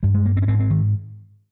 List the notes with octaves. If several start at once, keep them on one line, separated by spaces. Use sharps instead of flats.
G2 G3
G#3
A#3
C4
C#4
G#2 C4
C4
D#3